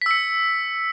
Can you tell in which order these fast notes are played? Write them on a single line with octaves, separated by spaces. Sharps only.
B6 E6 C#7